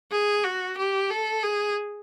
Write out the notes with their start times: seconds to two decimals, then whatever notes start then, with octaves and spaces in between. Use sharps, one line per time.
0.12 G#4
0.44 F#4
0.78 G4
1.10 A4
1.43 G#4